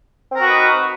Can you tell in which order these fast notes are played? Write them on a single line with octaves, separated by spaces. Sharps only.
C4 A#4 F#4 B4 D#4